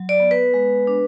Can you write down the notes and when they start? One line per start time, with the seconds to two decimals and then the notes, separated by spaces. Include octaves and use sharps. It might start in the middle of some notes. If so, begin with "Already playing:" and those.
Already playing: F#3
0.09 D5
0.20 B3
0.31 B4
0.54 G#3
0.87 D4